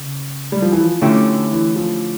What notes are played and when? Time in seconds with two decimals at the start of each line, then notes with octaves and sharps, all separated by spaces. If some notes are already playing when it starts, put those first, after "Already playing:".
Already playing: C#3
0.52 G3
0.62 F3
0.72 E3
0.80 F3
1.02 D3 A3 C#4 E4 G4
1.52 E3
1.76 F3